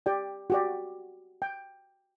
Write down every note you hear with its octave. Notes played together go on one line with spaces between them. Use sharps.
G4 D5 G5
F#4 G4 D5
G5